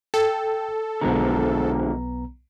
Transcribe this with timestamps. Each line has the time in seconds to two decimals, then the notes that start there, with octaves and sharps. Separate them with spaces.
0.14 A4 G5
1.01 B1 D3 F3 G#3 B3 A#5